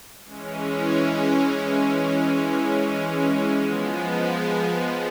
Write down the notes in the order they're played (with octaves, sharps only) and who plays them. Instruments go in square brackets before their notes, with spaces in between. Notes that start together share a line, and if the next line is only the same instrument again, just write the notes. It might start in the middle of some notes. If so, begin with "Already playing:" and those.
[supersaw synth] E3 G#3 C#4
F3 G#3 B3